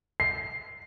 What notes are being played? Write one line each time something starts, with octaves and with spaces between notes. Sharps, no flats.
C7